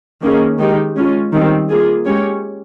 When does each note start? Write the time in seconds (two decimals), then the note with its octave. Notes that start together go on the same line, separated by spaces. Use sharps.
0.22 D#3 A#3 C#4 G#4
0.59 D#3 G#3 D#4 G4
0.96 G#3 C#4 F4
1.32 D#3 G3 C4
1.69 A#3 F4 G#4
2.05 G#3 C#4 G4 C#5